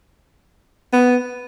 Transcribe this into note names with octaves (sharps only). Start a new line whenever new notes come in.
B3